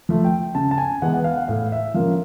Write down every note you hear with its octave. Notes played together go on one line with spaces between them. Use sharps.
F3 A3
G5
C#3 A5
A5
G#5
E3 G#3 B3 F#5
F#5
F5
F#5
A2 F5
E5
F3 A#3 C#4 F5